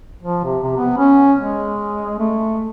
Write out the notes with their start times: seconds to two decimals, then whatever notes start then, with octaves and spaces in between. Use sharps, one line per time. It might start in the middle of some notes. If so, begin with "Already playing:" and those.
0.23 F3
0.44 C3
0.63 C3
0.77 B3
0.98 C#4
1.39 G#3
2.19 A3